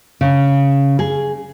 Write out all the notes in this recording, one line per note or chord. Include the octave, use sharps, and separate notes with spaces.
C#3
G#4